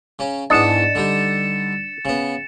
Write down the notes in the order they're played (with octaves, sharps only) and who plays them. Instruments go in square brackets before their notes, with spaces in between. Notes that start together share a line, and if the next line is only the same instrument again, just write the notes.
[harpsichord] C#3 C#4
[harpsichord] E2 G#2 B3 [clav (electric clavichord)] D4 D#5 [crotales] A6 C#7 E7
[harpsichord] D3 G3 D#4
C#3 B3